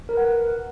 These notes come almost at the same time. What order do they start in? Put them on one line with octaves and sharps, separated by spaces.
A#4 B4 F#5